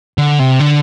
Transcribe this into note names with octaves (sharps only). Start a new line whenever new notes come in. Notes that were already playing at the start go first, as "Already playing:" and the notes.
D3
C3
D3